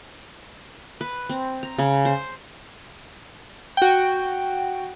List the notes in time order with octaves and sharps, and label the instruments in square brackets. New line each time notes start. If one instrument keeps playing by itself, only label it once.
[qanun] B4
C4
A#5
C#3
C5
[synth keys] F#4 G5